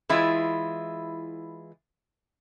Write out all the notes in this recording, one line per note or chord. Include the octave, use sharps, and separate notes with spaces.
E3 G#3 E4 F4